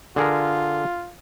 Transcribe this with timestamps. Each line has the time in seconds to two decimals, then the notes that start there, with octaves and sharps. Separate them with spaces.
0.16 D3 F4 G#4 A#4